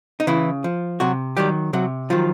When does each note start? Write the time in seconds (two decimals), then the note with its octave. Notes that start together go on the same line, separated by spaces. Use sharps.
0.20 D#4
0.27 C#3 E3 E4
0.64 F3
1.00 C3 F#3 F#4
1.37 D#3 F#3 G3 G4
1.73 C3 F#3 F#4
2.10 D#3 F3 F#3 F4